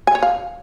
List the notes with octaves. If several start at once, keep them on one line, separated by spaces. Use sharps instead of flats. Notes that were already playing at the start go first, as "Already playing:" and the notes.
G#5
C#5
F5